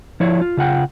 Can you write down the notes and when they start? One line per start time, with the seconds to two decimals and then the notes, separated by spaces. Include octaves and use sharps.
0.20 F3 E4 C#5 D5
0.41 F4
0.57 C#3 F4 F#5 G5